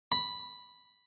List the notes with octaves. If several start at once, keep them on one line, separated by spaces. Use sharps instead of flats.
B5